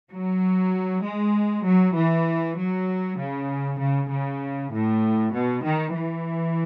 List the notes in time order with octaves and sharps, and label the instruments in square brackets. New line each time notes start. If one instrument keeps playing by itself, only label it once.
[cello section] F#3
G#3
F#3
E3
F#3
C#3
C#3
C#3
A2
B2
D#3
E3